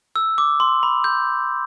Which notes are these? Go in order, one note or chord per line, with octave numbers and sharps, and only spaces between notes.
E6
D6
C6
B5
G6